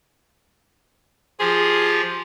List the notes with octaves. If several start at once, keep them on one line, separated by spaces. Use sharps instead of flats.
F3 F4 G4 G#4